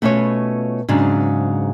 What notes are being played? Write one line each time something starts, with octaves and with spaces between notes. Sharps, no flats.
B2 A3 C#4 F4 B4 C#5
G#2 C#3 F#3 C4 D4